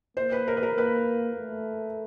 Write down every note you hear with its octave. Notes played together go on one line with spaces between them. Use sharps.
A#3 C5
B4
A#4
B4
A#4
A#3 B4
A3